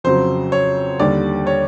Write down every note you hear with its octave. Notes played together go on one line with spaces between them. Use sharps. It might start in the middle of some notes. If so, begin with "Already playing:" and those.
F2 C#3 F#3 C5
C#5
D#2 D3 G3 D5
C#5